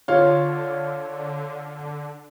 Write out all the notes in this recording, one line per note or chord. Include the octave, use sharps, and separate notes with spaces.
D3 F4 C#5 F5